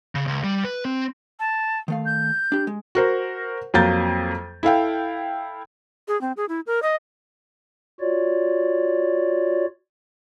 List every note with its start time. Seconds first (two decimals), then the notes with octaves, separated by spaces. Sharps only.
0.15 C#3
0.27 C#2
0.44 G3
0.64 B4
0.85 C4
1.40 A5
1.88 D#3 A3 F5
2.06 G6
2.52 D4 G4
2.67 G#3
2.95 F#4 A#4 C5
3.74 F2 F#3 A#3 A#5 G6 A6
4.63 E4 A4 F5 G5
6.08 G#4
6.21 C4
6.37 G#4
6.49 E4
6.67 A#4
6.82 D#5
8.01 F4 F#4 C#5 D5